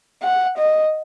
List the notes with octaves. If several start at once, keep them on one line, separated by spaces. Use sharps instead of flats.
F#5
D#5